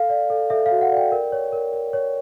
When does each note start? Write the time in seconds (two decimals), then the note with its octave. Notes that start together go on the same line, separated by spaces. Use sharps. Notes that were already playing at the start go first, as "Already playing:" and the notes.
Already playing: A4 F5
0.09 D5
0.30 A4
0.50 A4 E5
0.66 F5
0.71 F#4
0.81 F#5
0.92 D5 G5
1.12 A#4
1.32 C#5
1.53 A#4
1.73 A#4
1.93 C#5